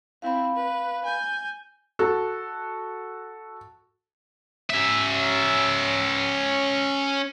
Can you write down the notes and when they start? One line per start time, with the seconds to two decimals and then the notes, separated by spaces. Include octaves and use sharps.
0.22 C4 E4 F5 B5
0.55 B4
1.05 G#5 G6
1.99 F#4 A4
4.70 C#4 E5